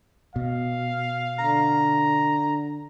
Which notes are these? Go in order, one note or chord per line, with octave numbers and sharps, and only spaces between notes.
B2 F5
D3 A#5